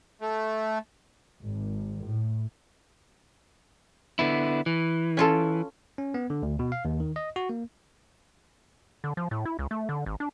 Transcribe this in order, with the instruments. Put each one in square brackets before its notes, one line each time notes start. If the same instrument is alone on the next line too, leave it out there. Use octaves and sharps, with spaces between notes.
[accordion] A3
[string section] G#1
A2
[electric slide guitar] D3 B3 E4
E3
[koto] C#4 F4 A4
[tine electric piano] C#4
B3
D3
D2
B2
F5
D#2
D#3
D#5
F#4
A#3
[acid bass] D3
F3
A2
E4
C#2
A3
D3
G#1
D4